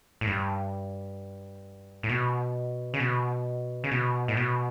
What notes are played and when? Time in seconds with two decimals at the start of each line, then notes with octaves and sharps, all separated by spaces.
0.21 A2
0.27 G2
2.03 A2
2.09 B2
2.94 C#3
3.00 B2
3.84 C#3
3.91 B2
4.28 A2
4.37 B2